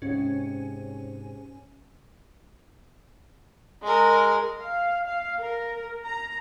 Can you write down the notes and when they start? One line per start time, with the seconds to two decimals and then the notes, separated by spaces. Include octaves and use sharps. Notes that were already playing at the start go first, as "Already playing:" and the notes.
0.02 G#2 C3 C#4
3.83 G#3 A#4
4.59 F5
5.06 F5
5.41 A#4
6.04 A#5